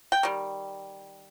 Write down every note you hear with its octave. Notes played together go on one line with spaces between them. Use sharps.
G5
D#3 G3